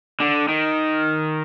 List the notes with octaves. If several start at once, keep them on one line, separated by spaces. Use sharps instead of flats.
D3
D#3